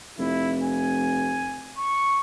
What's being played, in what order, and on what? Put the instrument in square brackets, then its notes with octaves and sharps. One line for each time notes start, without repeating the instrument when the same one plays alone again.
[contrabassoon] F1 [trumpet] E4
[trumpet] G#5
C#6